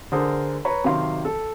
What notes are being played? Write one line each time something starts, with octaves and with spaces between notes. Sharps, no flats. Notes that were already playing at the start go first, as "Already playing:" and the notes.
D3 G#4 A#4 C5 D#6
B4 C#5 A#5 B5
C3 D#3 F#3 F5 C6
A4